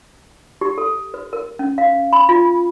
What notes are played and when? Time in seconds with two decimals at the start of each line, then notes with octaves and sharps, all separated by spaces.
0.61 G4
0.78 A4
1.14 B4
1.33 A#4
1.59 C#4
1.78 F5
2.13 B5
2.29 F4